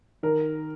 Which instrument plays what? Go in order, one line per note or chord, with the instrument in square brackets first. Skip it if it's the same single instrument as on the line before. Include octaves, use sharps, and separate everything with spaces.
[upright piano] D#3 A#4